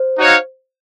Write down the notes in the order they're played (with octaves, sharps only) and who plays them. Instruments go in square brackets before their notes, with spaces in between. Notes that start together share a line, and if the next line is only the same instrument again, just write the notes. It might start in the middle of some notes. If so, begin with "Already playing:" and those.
Already playing: [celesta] C5
[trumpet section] D#4 F#4 C#5 F5